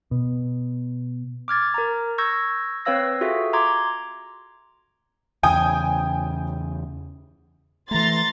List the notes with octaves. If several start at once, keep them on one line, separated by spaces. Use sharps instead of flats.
B2
D6 F6 G#6 A6
A#4 A#5
C#6 E6 G6 G#6 A#6
C4 B4 C#5 F5 E6 A#6
F4 F#4 G#4 A4 E5
A#5 C6 D6 G#6
E2 C#3 G5 G#5 D#6
E3 A3 A#5 C6 A6